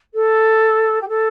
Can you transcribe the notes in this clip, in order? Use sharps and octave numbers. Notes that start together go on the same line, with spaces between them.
A4
G4
A4